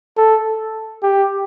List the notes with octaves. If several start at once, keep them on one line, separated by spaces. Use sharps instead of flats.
A4
G4